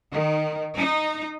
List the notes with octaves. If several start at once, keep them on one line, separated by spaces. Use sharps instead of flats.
D#3
D#4